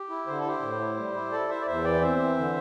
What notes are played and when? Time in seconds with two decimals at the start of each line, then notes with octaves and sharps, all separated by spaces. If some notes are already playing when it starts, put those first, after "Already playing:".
Already playing: G4
0.09 E4
0.27 D3 C5
0.38 A4
0.44 E4 G4 C5
0.62 A2
0.80 E4
0.97 G3
1.14 E4
1.32 E4 A4 D5
1.49 E4 C5 E5
1.61 D5
1.66 E2 C5 E5
1.84 E3 D5 G5
2.02 C4 C5 E5
2.19 E3
2.37 D3